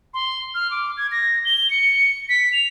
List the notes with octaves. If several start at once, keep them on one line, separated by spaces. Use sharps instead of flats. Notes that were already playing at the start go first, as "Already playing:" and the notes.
C6
F6
D6
G#6
A#6
G7
C#7
B6
F7